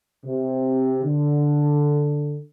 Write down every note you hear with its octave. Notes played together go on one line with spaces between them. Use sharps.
C3
D3